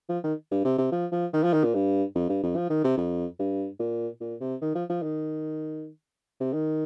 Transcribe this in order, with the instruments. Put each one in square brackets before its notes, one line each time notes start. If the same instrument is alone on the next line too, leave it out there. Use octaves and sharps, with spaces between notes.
[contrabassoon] F3
D#3
G2
C3
C3
F3
F3
D#3
F3
D#3
A#2
G2
F2
G2
F2
F3
D#3
C3
F2
G2
A#2
A#2
C3
D#3
F3
F3
D#3
C3
D#3